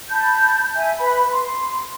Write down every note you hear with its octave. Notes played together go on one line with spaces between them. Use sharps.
A5 B5 G6
E5 G#5
B4 B5
C6